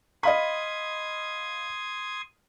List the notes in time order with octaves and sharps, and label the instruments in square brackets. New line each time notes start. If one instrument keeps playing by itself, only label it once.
[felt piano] D#5 F5 B5 [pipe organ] C6 D#6 G#6